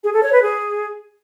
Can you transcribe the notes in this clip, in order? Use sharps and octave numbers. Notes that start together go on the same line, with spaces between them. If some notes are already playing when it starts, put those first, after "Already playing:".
G#4
A4
C#5
B4
G#4